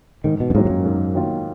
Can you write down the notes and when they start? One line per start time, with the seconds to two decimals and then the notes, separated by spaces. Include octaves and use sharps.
0.24 G#2 D#3
0.40 B2
0.50 F#2
0.55 G#2 D#3 F#3 A#3 F4
0.65 G#2
0.70 F#2
0.85 G#2
1.15 D#3 F#3 A#3 F4